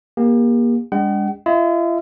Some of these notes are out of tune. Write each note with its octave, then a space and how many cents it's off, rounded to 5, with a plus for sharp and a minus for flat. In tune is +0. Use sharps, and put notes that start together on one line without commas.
A#3 +25 G4 +40
G#3 -40 D4 -30 F#5 +45
F4 -45 D#5 +40